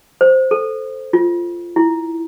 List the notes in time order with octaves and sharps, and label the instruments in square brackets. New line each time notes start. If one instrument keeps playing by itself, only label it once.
[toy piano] C5
A4
F4
E4